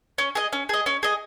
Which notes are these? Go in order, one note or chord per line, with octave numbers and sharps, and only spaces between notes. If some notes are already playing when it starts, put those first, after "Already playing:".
C#4
G#4 D#5
C#4
G#4 D#5
C#4
G#4 D#5